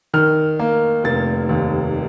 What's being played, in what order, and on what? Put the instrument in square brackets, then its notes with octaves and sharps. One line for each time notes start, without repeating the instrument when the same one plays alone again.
[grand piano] D#3 F6
A#3
F1 A6
D#2